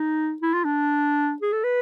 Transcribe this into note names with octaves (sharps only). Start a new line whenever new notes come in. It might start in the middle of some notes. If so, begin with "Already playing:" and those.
Already playing: D#4
E4
F4
D4
G#4
A4
B4